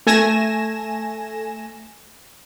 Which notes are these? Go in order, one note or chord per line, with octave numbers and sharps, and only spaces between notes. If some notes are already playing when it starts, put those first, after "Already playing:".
A3 G#5 A#6 E7